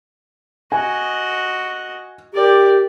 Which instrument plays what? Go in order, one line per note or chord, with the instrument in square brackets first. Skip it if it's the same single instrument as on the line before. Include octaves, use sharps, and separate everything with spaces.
[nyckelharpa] F#4 D#5 [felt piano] G#5
[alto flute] G4 [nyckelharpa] A#4 D5